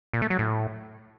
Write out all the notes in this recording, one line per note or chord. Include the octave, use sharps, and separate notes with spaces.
A#2
A3
F#3
A2